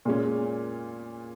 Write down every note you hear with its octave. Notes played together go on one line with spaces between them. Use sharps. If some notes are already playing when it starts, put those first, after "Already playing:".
A#2 G#3 C#4